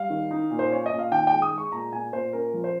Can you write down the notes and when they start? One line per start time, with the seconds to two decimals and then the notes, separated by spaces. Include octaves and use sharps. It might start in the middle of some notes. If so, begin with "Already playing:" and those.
Already playing: G3 F5
0.10 D#3
0.31 D#4
0.51 A#2
0.59 C5
0.71 C#4 C#5
0.86 D#5
0.91 A#2
0.99 F5
1.12 D#3 G5
1.27 G#3 G5
1.42 D#6
1.52 G#3
1.58 C#6
1.72 A#2 A#5
1.92 A#2 G#5
2.12 A#2 C5
2.33 C#4 A#4
2.54 F3
2.64 C5